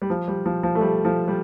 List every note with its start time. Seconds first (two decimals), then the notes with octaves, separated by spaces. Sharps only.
0.02 G3
0.10 F3
0.28 G3
0.46 F3
0.63 F3
0.75 A3
0.81 G3
1.05 F3
1.28 G3